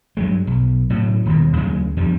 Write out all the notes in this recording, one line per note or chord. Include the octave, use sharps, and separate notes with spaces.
G2 F#3 G#3
B1
A2 C#3 F#3
D#1 D#2 B2
D2 C#3 F#3 G#3
E2 G2 F3 G3